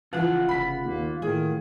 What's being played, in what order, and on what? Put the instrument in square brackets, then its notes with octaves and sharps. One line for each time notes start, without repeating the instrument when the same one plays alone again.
[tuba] C#3 [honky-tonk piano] E3 F3 [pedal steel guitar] F4 F#5
[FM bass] F1 [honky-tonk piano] B5 B6
[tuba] D#2 [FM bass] A#3
[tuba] A2 [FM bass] D#3 [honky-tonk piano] G#4